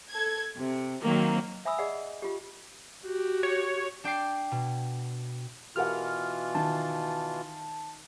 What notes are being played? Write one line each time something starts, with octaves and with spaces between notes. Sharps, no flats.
A4 G#6
C3
D#3 F#3 A#3 C4
E5 G#5 B5 D#6 E6
G#4 D5 D#5 F#5
F4 G4
F#4 G4
C#5
D4 G5 D6 C7
B2
B2 E3 F4 G4 A#4 F#5 F6
D#3 A5